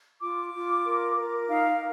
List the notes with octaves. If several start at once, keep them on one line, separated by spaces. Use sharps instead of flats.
F4 D6
F4
A#4
A#4
D#4 F5